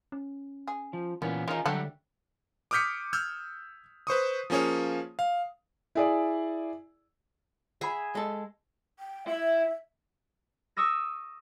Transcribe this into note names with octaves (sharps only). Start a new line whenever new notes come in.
C#4
G#4
F3
A#2 D#3 E3 B3 C#4
C#3 C#4 D#4 F4 A#4
D3 F#3 G3 A3 D4 G4 F#5
D6 D#6 F6 G6 B6 C#7
E6 F6 G6 G#6
B4 C5 C#6 D#6
F3 A#3 C#4 G#4 C#5
F5
E4 G#4 D5
G#4 E5 F#5 B5
G#3 A4
G5
E4 E5
C#6 D#6 E6 A#6